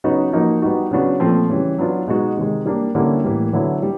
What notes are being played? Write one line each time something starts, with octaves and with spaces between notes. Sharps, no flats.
C#3 F#3 B3 D#4 F#4
F3 A#3 D#4 F#4
G3 B3 D#4 F#4
C#3 F#3 B3 D4 F#4
A#2 F3 A3 C4
C#3 E3 G3
F#3 B3 D4 F4
B2 G#3 B3 D#4 F#4
C3 D#3 G#3
G3 A#3 D4
D3 G3 A#3 C#4 E4
A2 E3 G3 A#3
D3 F#3 B3 E4
G3